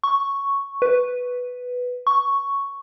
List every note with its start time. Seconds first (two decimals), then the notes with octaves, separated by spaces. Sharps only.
0.04 C#6
0.82 B4
2.07 C#6